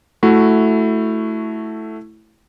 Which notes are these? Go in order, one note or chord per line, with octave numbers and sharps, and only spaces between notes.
A3 E4 F#4